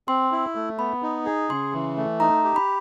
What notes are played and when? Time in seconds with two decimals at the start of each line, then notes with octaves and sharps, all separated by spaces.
0.08 C4 C6
0.32 E4
0.55 A3
0.78 B3 B5
1.02 D#4
1.26 G#4
1.49 C#3 C6
1.73 E3
1.97 A3
2.20 D#4 A#5
2.44 G4
2.56 B5